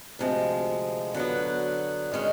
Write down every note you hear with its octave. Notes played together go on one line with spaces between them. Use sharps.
D2 C3 F3 G#3
D3 F#3 B3
D#3 G#3 C#4